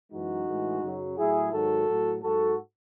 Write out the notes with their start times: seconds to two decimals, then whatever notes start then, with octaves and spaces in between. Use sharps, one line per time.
0.11 F#2 E3 G#3 D#4 F#4
0.46 A2 E3 G#3
0.81 F#2 C#3 F#3
1.16 A2 F#3 E4 G#4
1.51 G#2 D#3 F#3 F#4 A4
1.87 A2 F#3
2.22 G#2 F#3 F#4 A4